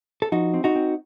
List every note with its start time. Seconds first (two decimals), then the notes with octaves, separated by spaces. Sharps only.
0.22 A4
0.32 F3 D#4 F#4
0.54 C4
0.64 D#4 F#4
0.75 C4